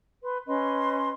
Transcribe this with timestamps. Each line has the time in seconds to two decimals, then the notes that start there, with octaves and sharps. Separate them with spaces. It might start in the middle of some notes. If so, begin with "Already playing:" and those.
0.23 B4 C6
0.47 C#4 B4 D#5 C6